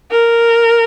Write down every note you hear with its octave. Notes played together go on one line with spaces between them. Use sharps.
A#4